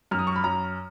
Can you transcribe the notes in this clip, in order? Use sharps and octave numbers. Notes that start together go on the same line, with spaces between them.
F#2 F6
D#6
C#6
B5
F#2 A#5